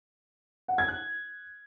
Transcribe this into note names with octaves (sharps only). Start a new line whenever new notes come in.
F#5
G#6
F#6